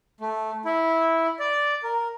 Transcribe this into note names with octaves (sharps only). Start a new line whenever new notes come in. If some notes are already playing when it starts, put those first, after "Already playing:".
A3
E4
D5
A#4